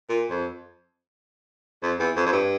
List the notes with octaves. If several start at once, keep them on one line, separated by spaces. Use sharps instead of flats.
A#2
F2
F2
E2
F2
F2
G2